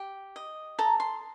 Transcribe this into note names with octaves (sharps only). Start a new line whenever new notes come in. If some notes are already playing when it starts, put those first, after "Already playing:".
Already playing: G4
D#5
A4 A#5
C6